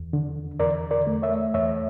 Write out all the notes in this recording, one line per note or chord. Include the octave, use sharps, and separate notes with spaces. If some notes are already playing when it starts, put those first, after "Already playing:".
Already playing: E2
D3
E2 A#4 D5
A#4 D5
A3
C#5 E5
E2 C#5 E5